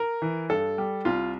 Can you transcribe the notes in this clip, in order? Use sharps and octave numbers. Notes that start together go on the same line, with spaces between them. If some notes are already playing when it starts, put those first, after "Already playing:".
Already playing: A#4
E3
G2 A4
G3
C2 F4